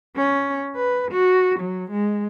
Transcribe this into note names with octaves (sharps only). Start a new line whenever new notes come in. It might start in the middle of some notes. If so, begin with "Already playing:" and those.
C#4
B4
F#4
F#3
G#3